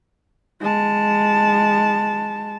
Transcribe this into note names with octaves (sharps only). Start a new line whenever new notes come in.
G#3 A5